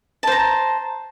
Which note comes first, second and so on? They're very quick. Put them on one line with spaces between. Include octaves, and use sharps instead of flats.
A5 C5 A#5